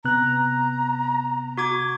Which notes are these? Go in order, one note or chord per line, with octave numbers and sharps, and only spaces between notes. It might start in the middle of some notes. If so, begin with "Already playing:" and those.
C3 B3 A#5 F#6
F#4 D6 G#6